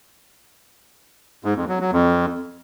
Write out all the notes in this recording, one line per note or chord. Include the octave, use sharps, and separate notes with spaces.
G#2
F2
F#3
F#3
F2